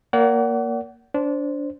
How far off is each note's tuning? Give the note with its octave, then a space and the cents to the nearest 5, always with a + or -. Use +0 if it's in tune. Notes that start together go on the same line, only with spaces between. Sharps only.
A#3 +0 D5 -40 F#5 +25
D4 -20 C5 +0